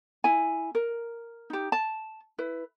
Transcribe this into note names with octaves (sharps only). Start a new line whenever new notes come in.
E4 G#5
A#4
D#4 G4
A5
E4 B4